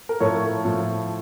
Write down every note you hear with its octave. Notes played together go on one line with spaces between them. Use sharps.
A#4
A2 F3 A4 C#5
A2 F3